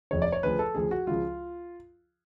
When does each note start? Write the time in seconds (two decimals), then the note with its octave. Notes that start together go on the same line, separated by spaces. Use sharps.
0.11 F1 F2 C#3 C#5
0.22 D5
0.32 C#5
0.43 D2 C#3 F3 B4
0.59 A4
0.75 D2 C#3 F3 G#4
0.91 F#4
1.07 C#2 C#3 F3 F4